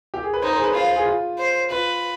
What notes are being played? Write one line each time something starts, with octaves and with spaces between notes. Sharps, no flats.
G4
G#4
B4
D#4 C5
C5
G#4
B4
F4 C5
C5
G#4
F4
C5
F4 B4